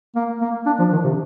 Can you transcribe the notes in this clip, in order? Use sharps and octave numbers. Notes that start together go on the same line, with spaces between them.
A#3
A#3
D4
F3
D#3
C3